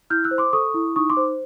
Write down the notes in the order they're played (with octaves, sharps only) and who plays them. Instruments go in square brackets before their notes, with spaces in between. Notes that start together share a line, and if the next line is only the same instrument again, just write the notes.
[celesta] E4 F6 G6
E6 F#6
C5
C6 D6
A4 C#6 D#6
E4
D#4 C#6 D#6
C6 D6
C5